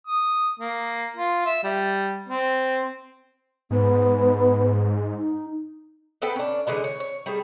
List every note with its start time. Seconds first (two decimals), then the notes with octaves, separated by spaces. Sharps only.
0.07 D#6
0.59 A#3
1.16 F4
1.46 E5
1.64 G3
2.29 C4
3.71 G#2 B3
5.18 D#4
6.22 B3 A4 B4 G5
6.36 C#4 D4
6.67 D3 E3 G#3 G#5
6.84 C#5
7.00 C#5
7.26 G3 A3 G#4